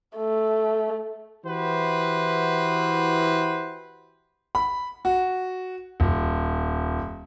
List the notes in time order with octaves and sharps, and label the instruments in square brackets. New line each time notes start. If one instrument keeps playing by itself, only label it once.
[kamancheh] A3
[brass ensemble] E3 E4 F#4 G4 B4 C5
[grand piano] B5
F#4
D#1